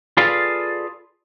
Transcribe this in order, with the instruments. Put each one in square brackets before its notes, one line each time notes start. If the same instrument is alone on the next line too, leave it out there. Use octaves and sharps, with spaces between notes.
[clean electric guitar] F4 G#4 A4 B4 D5 F5